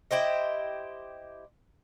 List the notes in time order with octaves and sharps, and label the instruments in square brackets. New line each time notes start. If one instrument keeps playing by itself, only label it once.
[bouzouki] E4 G4 C5 D#5